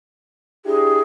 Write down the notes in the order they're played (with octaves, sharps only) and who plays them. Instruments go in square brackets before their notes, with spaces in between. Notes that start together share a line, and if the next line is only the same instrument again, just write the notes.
[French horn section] D4 E4 G4 [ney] G#4